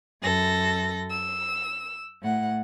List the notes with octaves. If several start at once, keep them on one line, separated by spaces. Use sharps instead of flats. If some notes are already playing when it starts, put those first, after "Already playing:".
F#2 A4 A#6
E6
A2 F#5